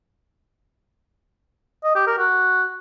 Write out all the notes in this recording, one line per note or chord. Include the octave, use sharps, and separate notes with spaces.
D#5
G4
A#4
F#4